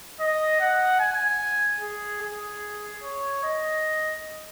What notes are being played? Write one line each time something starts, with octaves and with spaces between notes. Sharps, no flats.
D#5
F#5
G#5
G#4
G#4
C#5
D#5